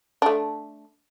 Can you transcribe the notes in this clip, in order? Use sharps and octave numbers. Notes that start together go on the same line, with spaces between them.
A3 D4